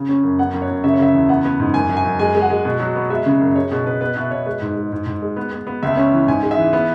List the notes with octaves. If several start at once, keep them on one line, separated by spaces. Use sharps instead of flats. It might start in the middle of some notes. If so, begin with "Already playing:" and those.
Already playing: C#3
C#4
F#2
B3 F#5
F#2
C#5
F#2
C#3 E5
C#5
C#3 E5
E2
B3 F#5
B3
G#2
F#2 G#5
F#2
G#5
F#2
G#3 G#5
G#3
F#5
G#3
B2
F#3
B3
G#3 E5
C#3
F#2
G#3 C#5
B2 G#4
B2 B4
B3 B4
B2 E5
B2 C#5
G#3 B4
G#2
G#3
G#2
G#2
G#3
B3
B3
B3
C#2 E5
C#4
E3
G#2 G#5
G#3
E5
E3
B3